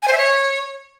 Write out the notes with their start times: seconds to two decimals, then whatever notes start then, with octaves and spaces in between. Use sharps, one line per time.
0.03 G#5
0.08 C5
0.13 E5
0.18 C#5